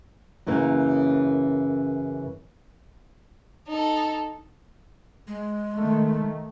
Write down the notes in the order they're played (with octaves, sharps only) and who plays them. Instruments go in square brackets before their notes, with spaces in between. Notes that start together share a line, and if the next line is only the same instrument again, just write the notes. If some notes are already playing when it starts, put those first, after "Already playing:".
[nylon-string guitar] F#2 C#3 E3 A#3
[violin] D#4 A4
[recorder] G#3
[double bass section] D#3 A3